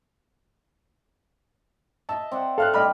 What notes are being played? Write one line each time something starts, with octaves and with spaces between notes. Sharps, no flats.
D#5 E5 A5
C4 D5 F#5
A4 F5 F6 F#6
G3 D4 D#5 B5 F6